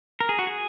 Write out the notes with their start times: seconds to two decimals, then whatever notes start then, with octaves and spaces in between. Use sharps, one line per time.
0.20 A#4
0.29 G#4
0.39 F#4
0.47 G#4